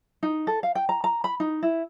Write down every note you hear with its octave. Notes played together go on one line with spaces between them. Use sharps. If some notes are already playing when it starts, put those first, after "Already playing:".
D#4
A4
F5
G5
A#5
A#5
B5
D#4
E4